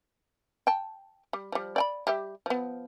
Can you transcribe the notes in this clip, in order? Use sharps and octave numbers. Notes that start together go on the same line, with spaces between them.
G5 A5
G3
F3 G3
D5 G5 B5
G3 G4 E5
F3 B3